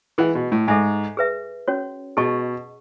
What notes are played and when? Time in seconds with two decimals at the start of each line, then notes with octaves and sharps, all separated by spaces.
0.18 E3 G#4 D#5 F#5
0.35 B2
0.52 A2
0.68 G#2 A4 E5 G#5
1.17 G#4 B4 E5
1.68 C#4 F#4 C#5
2.17 B2 G#4 D#5 A5 C#6